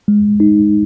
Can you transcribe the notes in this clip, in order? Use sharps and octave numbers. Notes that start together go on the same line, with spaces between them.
G#3
D#4